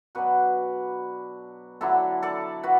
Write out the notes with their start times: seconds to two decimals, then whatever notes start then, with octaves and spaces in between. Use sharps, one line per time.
0.15 B2 F#3 D4 F#4 B4
1.81 D3 F#3 D4 E4 A4
2.23 A4 D5
2.63 F#4 B4